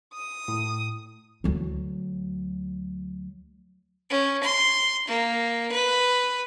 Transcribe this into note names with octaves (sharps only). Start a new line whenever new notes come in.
D#6
A2
D2 F#3
C#4
C6
A#3
B4